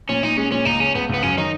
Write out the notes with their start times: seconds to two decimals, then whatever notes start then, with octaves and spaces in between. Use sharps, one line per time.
0.09 A#2 C#4
0.23 A#2 D#4
0.37 G#3 C#4
0.52 A#2 C#4
0.65 C#2 D#4
0.80 C#3 C#4
0.95 C#2 B3
1.09 C#2 B3
1.23 F#2 C#4
1.38 D#3 D#4